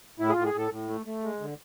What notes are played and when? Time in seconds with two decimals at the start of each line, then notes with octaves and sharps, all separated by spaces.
0.19 A2 E4
0.29 G#4
0.32 A2 F4
0.45 G#4
0.54 A2 A4
0.72 A2
0.89 A3
1.06 A3
1.23 G#3
1.41 D3